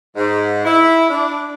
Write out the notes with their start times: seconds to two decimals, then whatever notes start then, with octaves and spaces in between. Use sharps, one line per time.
0.17 G#2
0.65 E4
1.09 D4